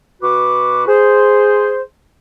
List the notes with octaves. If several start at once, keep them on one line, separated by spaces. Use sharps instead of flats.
B2 F#4 B4 D6
G#4 C5